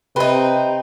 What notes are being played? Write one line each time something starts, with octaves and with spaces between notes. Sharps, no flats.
C3 C4 D#4 B4